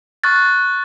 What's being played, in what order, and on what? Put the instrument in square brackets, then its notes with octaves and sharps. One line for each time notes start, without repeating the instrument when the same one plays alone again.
[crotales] C#6 F6 F#6 A6